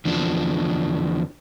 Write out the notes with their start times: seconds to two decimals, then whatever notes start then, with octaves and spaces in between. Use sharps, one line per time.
0.05 E2 D3 F3 D4